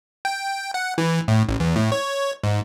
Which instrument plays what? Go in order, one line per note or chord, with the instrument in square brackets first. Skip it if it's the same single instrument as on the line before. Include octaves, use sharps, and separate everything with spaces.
[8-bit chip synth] G5
F#5
E3
A2
A1
E2
A2
C#5
G#2